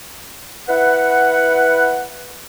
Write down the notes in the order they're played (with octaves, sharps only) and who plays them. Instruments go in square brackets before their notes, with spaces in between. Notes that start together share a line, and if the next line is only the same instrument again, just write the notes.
[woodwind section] E4 B4 F#5